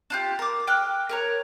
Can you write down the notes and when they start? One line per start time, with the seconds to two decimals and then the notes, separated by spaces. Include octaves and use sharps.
0.10 D4 F4 G4
0.39 A#4 D6
0.67 G5 D6 F6 F#6
1.09 A#4 C#5 A#5